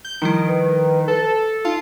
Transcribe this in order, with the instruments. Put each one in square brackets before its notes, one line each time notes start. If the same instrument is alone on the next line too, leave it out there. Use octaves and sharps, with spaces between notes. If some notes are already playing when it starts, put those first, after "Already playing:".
[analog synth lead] G6
[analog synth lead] D#3 [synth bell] F3 G3 E4
[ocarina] B4
[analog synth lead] A4
[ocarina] D#4 [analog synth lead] F4 [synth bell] F5 A5